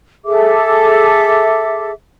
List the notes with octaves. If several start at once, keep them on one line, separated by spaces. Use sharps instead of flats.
G#4 A4 E5 D6